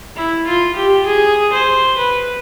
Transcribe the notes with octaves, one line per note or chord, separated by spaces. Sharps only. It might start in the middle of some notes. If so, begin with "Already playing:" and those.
E4
F4
G4
G#4
C5
B4